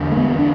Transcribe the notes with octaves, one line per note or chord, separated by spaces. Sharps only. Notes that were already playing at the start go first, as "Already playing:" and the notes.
Already playing: E2 D3
A3
B3
D4